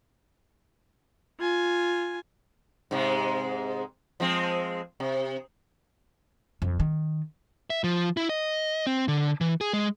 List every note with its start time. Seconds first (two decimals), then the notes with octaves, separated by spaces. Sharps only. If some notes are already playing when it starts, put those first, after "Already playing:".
1.40 F4 G#5
2.91 G#2 C3 G#3
4.20 F3 G#3 C4
5.00 C3
6.62 F2
6.80 D#3
7.70 E5
7.84 F3
8.17 E4
8.29 D#5
8.87 C4
9.08 D3
9.41 E3
9.61 G#4
9.73 G#3